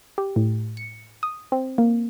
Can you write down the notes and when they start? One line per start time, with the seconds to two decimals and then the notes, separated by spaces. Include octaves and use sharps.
0.18 G4
0.36 A2
0.77 C#7
1.23 D#6
1.52 C4
1.78 A#3